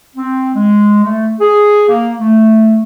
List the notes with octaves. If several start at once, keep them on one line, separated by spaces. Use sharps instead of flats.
C4
G#3
A3
G#4
A#3
A3